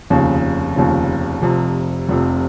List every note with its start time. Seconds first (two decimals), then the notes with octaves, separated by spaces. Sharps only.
0.10 F1 D#2 C#3 F3
0.76 F1 D#2 C#3 F3
1.42 F1 F2 C3
2.08 F1 F2 C3